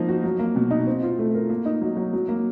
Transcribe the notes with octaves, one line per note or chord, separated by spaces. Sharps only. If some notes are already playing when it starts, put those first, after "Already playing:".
Already playing: F3 A#3 D#4
F#4
F#3
A#3
B2
D#4
C4
F4
A3
A#4
A#3
D#4
F#3
F#3
F#3
A#3